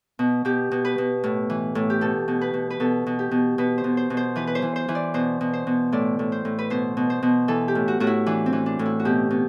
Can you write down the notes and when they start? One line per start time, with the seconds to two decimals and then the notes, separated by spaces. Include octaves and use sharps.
0.19 B2
0.45 B2 G4
0.71 B2
0.85 B4
0.98 B2
1.24 A2
1.50 E3
1.75 A2
1.90 G4
2.01 B2 A4
2.28 B2
2.41 B4
2.54 B2
2.70 B4
2.80 B2 A4
3.07 B2
3.19 G4
3.31 B2
3.58 B2 B4
3.78 C5
3.84 B2
3.97 C5
4.10 B2
4.17 C5
4.36 E3 B4
4.47 B4
4.55 C5
4.62 E3
4.76 C5
4.88 E3
4.95 D5
5.14 B2 C5
5.41 B2
5.53 C5
5.67 B2
5.92 A2 D5
6.19 A2
6.32 C5
6.45 A2
6.59 B4
6.70 B2 C5
6.97 B2
7.10 C5
7.22 B2
7.48 E3 A4
7.68 G4
7.75 A2
7.88 F#4
8.00 A2 F#4
8.07 E4
8.26 E3 D4
8.46 C4
8.53 E3
8.66 D4
8.79 A2
8.85 E4
9.00 F#4
9.05 B2 G4
9.30 B2